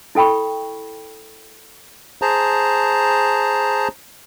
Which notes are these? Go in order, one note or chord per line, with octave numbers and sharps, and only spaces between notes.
E4 A4 G5 B5 C#6
G#4 C5 A5 A#5